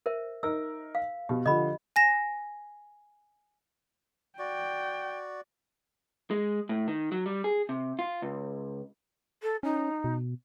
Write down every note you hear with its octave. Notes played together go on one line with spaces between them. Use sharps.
A#4 C5 E5
D#4 A#4 E6
F5
B2 G4
D3 F3 D#5 B5
G#5 A#6 E7
F#4 D5 G5
G#3
A2
D#3
F#3
G3
G#4
C3
F4
C#2
A4
C#4 D#4
B2